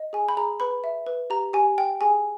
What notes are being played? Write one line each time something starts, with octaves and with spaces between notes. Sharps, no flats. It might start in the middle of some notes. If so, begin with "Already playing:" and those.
Already playing: D#5
G#4 G#5
B5
G#4 A#5
B4 B5
E5
B4
G4 A#5
G4 G#5
G5
G#4 G#5